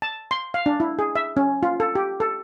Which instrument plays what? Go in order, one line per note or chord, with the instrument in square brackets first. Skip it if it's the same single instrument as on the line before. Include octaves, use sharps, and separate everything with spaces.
[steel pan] A5
C6
F5
D4
E4
G#4
E5
C#4
F4
A4
G4
A4